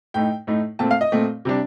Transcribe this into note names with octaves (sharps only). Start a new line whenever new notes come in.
A2 A3 D#4 G5
A2 A3 D#4
A#2 A3 C4 A5
F5
D#5
A#2 A3 C4
C3 G3 D4